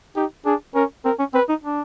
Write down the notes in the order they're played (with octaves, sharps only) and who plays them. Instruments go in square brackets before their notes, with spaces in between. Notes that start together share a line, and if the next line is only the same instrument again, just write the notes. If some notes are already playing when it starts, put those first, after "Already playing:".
[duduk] D#4 [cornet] G4
[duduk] D4 [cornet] G#4
[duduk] C#4 [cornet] A#4
[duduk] C4 [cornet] A#4
[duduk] C#4
[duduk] C4 [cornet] B4
[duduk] D#4
D4